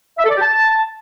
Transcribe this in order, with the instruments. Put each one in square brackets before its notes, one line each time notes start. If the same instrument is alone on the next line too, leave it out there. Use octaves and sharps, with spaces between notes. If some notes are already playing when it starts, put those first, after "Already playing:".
[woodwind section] E5
A4
D5
G4
A5